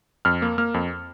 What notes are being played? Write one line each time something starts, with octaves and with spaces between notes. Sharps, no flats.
F2 F6
A#3
A#3 F6
F2